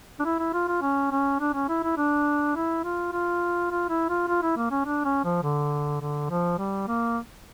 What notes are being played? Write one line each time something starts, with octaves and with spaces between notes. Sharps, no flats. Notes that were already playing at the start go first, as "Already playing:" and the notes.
D4
E4
E4
F4
F4
C#4
C#4
D4
C#4
E4
E4
D4
E4
F4
F4
F4
E4
F4
F4
E4
A#3
C#4
D4
C#4
F3
D3
D3
F3
G3
A#3